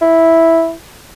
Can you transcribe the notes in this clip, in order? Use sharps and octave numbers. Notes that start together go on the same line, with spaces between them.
E4